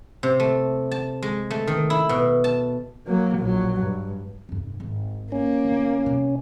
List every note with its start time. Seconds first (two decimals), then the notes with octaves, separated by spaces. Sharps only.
0.23 C3
0.40 A3
0.91 A5
1.22 G#3
1.50 A3
1.67 D#3
1.90 E4
2.09 B2
2.44 A5
3.07 F#3 A#3
3.38 A#1 F#3
3.79 G2
4.49 F1 G2
4.80 G#1
5.32 A#3 C#4
5.65 G1
6.06 C3 G3